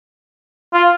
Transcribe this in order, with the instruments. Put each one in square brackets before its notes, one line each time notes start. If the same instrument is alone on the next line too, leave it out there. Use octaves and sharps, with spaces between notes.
[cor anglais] F4